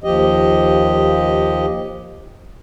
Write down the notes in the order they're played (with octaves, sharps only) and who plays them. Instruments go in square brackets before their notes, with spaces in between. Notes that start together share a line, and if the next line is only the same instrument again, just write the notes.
[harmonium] D#2 F3 G4 D#5